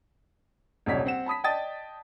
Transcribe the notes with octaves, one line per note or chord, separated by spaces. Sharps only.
D#1 B1 C3 C#4 D5 B6
C4 F#5 E7
A5 B5 D#6 B6
D5 D#5 G5 A5 D#6 A6